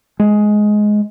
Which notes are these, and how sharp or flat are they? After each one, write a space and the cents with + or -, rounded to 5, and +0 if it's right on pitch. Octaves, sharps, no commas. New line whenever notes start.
G#3 +15